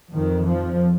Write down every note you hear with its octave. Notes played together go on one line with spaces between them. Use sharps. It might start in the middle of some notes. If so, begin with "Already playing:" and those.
F2 D#3
F3